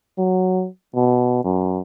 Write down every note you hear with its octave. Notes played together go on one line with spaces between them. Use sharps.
F#3
B2
F#2